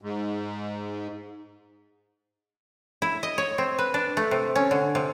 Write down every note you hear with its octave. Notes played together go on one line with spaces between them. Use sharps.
G#2
E4
D#5
C#5
C4
B4
D4
A3
C3
C#4
D3
C3